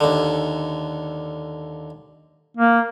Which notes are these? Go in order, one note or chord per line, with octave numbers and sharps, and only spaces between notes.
D#2 D3
A#3